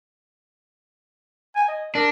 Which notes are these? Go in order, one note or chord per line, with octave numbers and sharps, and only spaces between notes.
G#5
D#5
D4 A#4